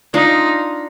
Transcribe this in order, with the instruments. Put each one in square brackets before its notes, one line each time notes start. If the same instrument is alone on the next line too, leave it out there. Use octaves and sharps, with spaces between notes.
[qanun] D4 F4 [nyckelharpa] D#4